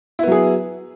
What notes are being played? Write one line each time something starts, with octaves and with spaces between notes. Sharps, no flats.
F#3 B3 E4 G#4